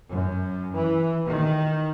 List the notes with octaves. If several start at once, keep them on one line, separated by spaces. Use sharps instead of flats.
F#2
E3
D#3